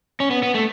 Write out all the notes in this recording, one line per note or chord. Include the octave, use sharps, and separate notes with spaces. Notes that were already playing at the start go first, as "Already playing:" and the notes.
C#4
B3
B3
A3